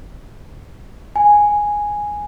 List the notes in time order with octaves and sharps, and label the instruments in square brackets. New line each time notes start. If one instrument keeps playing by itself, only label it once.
[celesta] G#5